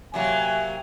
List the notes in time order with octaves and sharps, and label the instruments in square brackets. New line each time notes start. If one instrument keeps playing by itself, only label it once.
[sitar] C3 F#3 A#3 [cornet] G#5